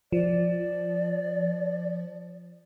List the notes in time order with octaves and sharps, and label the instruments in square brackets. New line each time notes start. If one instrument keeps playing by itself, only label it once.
[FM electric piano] F3 [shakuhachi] D5